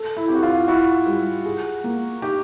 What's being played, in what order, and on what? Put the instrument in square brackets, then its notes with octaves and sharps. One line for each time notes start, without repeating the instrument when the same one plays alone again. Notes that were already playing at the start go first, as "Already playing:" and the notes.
Already playing: [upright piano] A4
[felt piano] E4
[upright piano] C4 [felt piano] G4
[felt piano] F#4
F4
[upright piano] E4 [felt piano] F#4
[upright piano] G3
G#4
A#3
[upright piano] D#4 [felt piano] G4